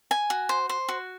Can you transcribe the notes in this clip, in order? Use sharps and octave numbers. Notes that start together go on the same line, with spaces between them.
G#5
F#4
C5
C5
F#4